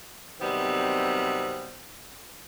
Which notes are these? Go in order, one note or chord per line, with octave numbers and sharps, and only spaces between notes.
C3 D#3 F#3 G3 B3 C4